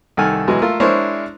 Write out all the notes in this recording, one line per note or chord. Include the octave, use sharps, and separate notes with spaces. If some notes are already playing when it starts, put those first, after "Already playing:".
C2 D#3 A4 F#5 G#5 F6
B2 E3 F#3 G#3
A3 F4 A4 A#4
G#3 D4 E4 A#4 C5 C#5